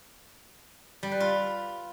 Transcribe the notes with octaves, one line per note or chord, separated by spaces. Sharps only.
G3
B4
F4